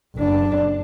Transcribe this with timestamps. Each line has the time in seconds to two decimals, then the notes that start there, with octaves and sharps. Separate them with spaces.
0.16 F#1 D4